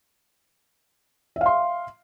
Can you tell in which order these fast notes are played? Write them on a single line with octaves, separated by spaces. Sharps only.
E5 F5 C6